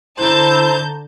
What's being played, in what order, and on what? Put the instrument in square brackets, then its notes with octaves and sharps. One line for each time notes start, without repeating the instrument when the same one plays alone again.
[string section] D3 G6 [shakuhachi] E4 [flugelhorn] C5 [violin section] A5 A#5